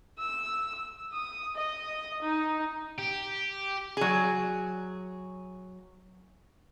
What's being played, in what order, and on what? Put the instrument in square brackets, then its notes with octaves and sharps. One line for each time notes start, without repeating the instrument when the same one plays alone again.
[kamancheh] E6
D#6
D#5
D#4
[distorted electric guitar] G4
[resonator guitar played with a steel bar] F#3 G#4